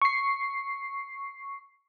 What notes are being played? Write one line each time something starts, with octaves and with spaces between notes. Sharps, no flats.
C#6 C7